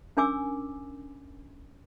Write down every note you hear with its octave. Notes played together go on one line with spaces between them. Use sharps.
C#4 D4 A#4 G#5 D6 E6